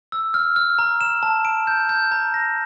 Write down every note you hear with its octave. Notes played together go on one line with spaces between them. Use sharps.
E6
F6
F6
A#5
E7
A5
D7
G6
G6
A#5
A#6